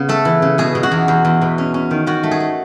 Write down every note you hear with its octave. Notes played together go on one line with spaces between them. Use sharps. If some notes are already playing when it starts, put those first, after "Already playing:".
Already playing: C#3 B3
A3 A4
E3
C#3
B2 G#4
B2
F#4
E2
E2
E2
B2
C#4
C#4
D#3
D#3 F#4
A3
G#4
A3